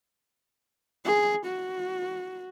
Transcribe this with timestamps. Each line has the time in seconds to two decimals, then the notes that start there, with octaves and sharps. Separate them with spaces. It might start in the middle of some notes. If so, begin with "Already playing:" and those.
1.05 G#4
1.47 F#4